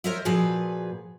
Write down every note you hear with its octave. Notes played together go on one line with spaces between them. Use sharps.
A#4 C5 C#5 D#5 E5
A#2 F3 F#4 G#4 B4